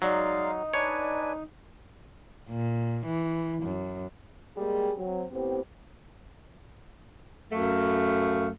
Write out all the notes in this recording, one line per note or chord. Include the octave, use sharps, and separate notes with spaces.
F#3 G#3 D#4 D5 F5
D4 B4 C#5 D5 G#5
A#2
E3
F#2
G3 G#3 A#3 G4 G#4
F#3 C4
A2 B3 C4 G4
F#2 A3 F5